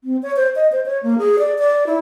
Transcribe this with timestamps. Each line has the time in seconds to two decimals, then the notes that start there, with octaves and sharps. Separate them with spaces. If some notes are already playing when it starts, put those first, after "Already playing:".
0.04 C4
0.23 C#5
0.36 C5
0.56 D#5
0.72 C5
0.86 C#5
1.03 A#3
1.18 G#4
1.39 D5
1.59 D5
1.87 E4